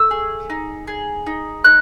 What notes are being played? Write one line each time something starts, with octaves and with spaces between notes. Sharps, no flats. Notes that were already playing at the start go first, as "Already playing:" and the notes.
Already playing: A3 E6
G#4
D#4
G#4
D#4
D#4 F#6